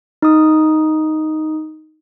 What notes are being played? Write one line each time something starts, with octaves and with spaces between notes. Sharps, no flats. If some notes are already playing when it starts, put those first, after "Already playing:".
D#4 D#6